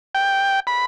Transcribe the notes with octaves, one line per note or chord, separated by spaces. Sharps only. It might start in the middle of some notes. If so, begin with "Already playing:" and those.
G5
B5